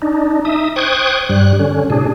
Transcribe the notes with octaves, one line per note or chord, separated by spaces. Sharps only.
D4 D#4
D#4 E5 D#6
C5 G5 C#6 D#6 F#6 G#6
G2 G3 F#6
D3 C#4
A2 C3 D4 G#4